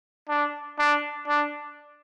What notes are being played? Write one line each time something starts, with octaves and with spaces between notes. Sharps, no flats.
D4
D4
D4